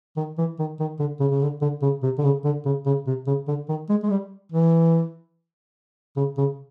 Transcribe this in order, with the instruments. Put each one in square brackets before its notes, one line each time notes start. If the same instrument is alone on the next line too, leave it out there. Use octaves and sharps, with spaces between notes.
[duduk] D#3
E3
D#3
D#3
D3
C#3
C#3
D3
D3
C#3
C3
D3
C#3
D3
C#3
C#3
C3
C#3
D3
D#3
G#3
G#3
G3
E3
C#3
C#3